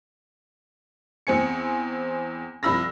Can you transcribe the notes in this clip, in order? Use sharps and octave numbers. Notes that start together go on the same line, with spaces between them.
E2 C4 G#5 C#7
C2 F3 B5 E6 A#6